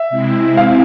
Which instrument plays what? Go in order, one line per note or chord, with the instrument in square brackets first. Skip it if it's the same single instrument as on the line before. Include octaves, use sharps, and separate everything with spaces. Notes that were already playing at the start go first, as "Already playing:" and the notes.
Already playing: [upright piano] E5
[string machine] C3 G#3 C4 E4
[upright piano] F5